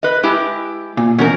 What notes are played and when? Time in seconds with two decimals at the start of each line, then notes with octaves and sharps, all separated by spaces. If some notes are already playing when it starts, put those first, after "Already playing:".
0.03 B4 D#5
0.23 G#3 E4 G4
0.97 A#2
1.18 B2 E3 F3 C#4 A#4